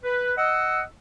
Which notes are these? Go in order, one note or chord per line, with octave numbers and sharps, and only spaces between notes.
B4
D#5 F#5 E6